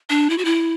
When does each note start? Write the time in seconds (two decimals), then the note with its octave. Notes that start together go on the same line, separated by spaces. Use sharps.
0.10 D4
0.30 E4
0.38 F#4
0.45 E4